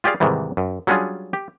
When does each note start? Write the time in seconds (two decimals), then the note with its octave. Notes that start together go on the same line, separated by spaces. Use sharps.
0.04 F4 G4 G#4 D5 F5
0.20 G#2 C3 D#3 E3 G3
0.57 F#2
0.87 F#3 G3 C#4 D4 F4 G#4
1.33 G4